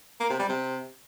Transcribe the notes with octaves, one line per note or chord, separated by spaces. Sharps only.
A#3
C3
G3
C3